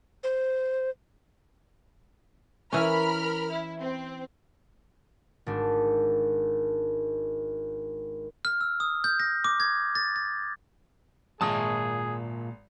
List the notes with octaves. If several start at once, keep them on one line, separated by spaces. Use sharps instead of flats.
C5
E3 C#4 A#4 B5 F6
E4
C4
G#1 D4
F6
E6
D#6
G6
A#6
D6
G#6
A6
A6
G#1 A#2 G#3 G#4 A5 D#6